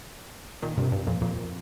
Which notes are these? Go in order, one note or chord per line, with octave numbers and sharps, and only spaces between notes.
A#2 D#3
G2 C3
G2
F2 A#2
F2 A#2